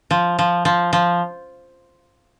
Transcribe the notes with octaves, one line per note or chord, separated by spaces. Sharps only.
F3
F3
F3
F3